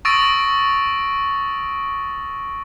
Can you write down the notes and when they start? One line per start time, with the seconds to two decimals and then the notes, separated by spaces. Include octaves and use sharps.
0.05 C#6 D#6 E6 A6 A#6 D7